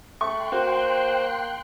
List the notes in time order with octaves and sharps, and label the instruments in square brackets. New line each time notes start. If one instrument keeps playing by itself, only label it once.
[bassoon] A3 [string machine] G5 C6 F#6 [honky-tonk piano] C#6
[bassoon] A#3 [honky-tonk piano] F#4 [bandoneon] C5